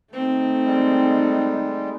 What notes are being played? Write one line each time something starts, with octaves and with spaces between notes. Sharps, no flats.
A3 C4 D#4
G3 G#3